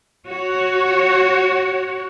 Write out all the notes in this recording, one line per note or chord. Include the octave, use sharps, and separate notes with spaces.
F#4 C#5